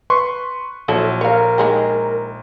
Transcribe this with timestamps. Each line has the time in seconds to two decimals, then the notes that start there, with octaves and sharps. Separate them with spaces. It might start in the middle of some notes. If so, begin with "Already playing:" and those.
0.10 B4 C6 C#6
0.88 A#1 F#3 E4 A4
1.21 A#4 C#5 F5
1.58 D#3 G#3 G4